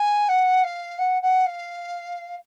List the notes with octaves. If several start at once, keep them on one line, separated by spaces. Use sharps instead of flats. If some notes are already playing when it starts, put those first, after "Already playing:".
Already playing: G#5
F#5
F5
F#5
F#5
F5